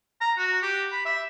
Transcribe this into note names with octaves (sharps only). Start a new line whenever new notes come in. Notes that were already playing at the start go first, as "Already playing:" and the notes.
A#5
F#4
G4
B5
E5